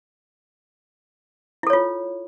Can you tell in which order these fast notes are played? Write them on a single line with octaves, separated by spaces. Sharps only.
E4 A4 C#5 F4